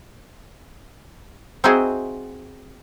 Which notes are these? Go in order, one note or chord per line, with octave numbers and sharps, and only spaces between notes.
C4 D#4 E4 F#4 G#4 C5